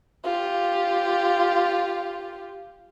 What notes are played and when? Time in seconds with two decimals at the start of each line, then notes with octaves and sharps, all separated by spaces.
0.24 F4 G4